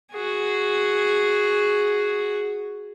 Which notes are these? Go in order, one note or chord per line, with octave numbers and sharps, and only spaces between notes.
F#4 G#4